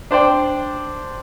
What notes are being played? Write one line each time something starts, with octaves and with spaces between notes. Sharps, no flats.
D4 C5 D5 G5